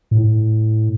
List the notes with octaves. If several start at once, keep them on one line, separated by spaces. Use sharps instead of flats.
A2